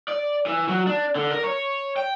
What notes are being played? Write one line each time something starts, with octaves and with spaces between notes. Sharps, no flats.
D5
E3
F#3
D4
D3
A#4
C#5
G5